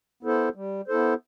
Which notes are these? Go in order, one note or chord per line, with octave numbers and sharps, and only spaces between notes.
B3 E4 A4 C5
G3
B3 E4 A4 C5